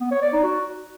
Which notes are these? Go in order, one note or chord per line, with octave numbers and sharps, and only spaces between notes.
B3
C#5
D5
D#4
F#4